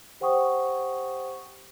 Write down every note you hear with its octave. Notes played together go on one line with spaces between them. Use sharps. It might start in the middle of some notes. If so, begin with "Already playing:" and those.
G4 C5 F#5 G5 C#6 D#6